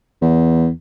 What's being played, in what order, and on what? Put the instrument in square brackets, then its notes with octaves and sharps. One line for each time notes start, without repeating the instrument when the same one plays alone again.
[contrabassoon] E2